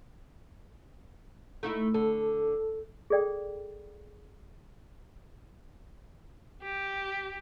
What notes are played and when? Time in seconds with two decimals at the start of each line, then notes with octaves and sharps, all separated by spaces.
1.63 A3 D#4 E4
1.94 D3 A4
3.10 G#4 A4 D5 G5
6.63 G4